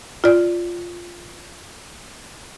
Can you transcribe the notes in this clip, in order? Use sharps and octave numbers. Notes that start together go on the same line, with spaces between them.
F4 D5